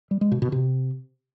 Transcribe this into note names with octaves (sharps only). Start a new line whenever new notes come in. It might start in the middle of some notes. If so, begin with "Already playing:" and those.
G3
G#3
B2
B2
C3